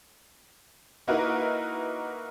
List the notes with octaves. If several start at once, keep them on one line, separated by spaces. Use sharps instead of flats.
A#3 D#4 E4 F#4 A#4 B4